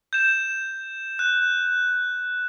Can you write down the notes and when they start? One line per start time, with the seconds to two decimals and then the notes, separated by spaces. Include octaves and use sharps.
0.13 G6 E7
1.19 F#6